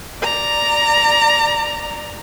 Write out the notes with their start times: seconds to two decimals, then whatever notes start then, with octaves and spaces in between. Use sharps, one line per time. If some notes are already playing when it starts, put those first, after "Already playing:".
0.20 D5 A#5